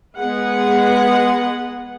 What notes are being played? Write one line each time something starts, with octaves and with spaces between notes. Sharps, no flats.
G#3 B3 G#4 B4 F#5